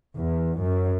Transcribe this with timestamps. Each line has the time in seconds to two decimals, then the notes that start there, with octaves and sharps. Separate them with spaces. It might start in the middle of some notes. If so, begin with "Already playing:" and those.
0.17 E2
0.62 F#2